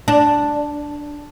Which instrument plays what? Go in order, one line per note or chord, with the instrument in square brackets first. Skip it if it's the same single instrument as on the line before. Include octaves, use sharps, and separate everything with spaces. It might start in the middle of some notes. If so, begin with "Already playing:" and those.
[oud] D4